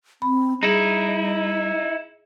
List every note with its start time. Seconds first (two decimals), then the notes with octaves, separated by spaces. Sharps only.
0.22 C4 B5
0.63 G3 D#4 E4 G#4